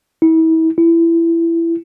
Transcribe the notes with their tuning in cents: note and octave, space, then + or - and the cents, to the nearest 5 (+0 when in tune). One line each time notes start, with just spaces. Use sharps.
E4 -35
E4 +20